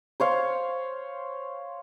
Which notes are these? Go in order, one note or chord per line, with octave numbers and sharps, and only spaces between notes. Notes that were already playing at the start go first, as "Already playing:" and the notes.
C5 C#5 F5